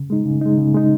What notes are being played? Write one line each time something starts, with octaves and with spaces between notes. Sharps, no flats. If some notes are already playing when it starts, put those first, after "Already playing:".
Already playing: C#3
G#3 D#4
C#3
G#3 D#4
C#3
G#3 D#4